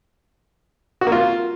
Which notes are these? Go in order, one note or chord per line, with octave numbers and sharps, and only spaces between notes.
F#4
A#3
F4